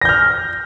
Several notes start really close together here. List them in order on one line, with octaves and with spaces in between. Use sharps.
A#6 G6 F6